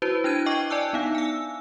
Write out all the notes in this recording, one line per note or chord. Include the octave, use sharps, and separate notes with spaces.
E4 F#4 B4 C5
D4 E4 F#6 G#6 D#7
D#5 G5 C#6 D6
D5 G#5 A5 E6 F#6
B3 D#4 F5
G#5 E6